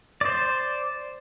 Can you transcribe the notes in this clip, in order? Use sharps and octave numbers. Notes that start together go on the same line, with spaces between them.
C5 D5